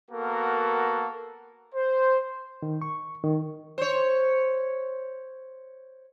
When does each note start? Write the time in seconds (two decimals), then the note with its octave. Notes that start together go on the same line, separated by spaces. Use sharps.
0.11 A#3 B3 F#4 A4 A#4
1.75 C5
2.62 D#3
2.82 C#6
3.24 D#3
3.78 C5 C#5